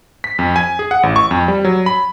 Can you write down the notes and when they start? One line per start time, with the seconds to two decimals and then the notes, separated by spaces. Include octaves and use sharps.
0.24 B6
0.39 F2
0.56 G#5
0.79 G#4
0.91 F#5
1.03 A1
1.16 C#6
1.31 F2
1.48 G3
1.64 F#3
1.86 B5